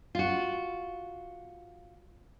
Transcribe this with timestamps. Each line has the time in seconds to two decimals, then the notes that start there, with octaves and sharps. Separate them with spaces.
0.15 F4 F#4